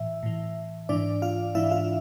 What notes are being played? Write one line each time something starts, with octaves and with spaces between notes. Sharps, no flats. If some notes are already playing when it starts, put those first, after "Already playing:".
Already playing: A2 E3 E5
A2 E3
G#2 E3 D4 D5
F4 F5
G#2 E3 E4 E5
F4 F5